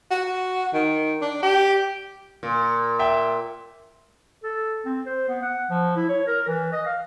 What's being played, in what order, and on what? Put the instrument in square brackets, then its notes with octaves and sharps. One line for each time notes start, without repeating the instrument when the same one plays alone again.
[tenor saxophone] F#4
D#3
D4
G4
[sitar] A#2
[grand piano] E5 G5
[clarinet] A4
C4
C5
B3
F#5
F3
E4
C#5
A#4
E3
D#5
F5